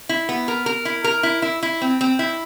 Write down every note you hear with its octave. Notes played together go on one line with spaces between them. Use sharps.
E4
B3
A#4
A#4
E4
A#4
E4
E4
E4
C4
C4
E4